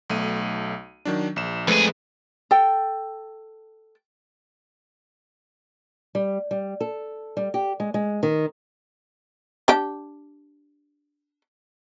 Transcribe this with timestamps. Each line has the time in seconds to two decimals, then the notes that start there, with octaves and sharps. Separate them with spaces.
0.10 B1 A3 D#7
1.05 D#3 F#3 D4
1.36 A#1 E7
1.68 F2 G#3 A3 G#4 B4
2.51 A4 G5
6.15 G3
6.51 G3
6.80 A4
7.37 G3
7.54 G4
7.80 G#3
7.94 G#3
8.23 D#3
9.68 D4 G4